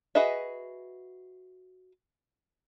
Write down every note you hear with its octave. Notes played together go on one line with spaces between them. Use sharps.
F#4 G#4 B4 D#5 E5